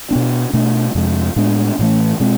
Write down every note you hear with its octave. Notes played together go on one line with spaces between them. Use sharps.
B2 B3 D4
B2 A3 D4
F2 C3 G#3
A2 G#3 B3 D4
A2 E3 A3
B2 G#3 C4